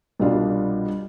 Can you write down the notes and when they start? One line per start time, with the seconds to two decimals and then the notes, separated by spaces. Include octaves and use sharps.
0.20 C2 B2 G3 D4 F4